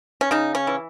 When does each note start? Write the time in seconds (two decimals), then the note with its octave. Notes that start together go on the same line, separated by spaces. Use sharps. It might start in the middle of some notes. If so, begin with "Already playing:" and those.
0.21 C#4
0.31 C#3 D#4
0.55 C#4
0.67 E3